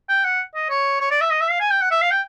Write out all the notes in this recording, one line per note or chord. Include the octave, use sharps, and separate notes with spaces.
G5
F#5
D#5
C#5
C#5
D5
E5
D#5
E5
F5
G#5
G5
F#5
E5
F5
G5